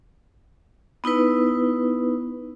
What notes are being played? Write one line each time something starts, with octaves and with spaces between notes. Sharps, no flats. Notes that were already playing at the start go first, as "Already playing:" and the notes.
B3 D#4 E4 B4